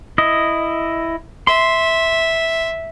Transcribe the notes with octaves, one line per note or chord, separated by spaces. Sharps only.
E4 D#5
E5 C6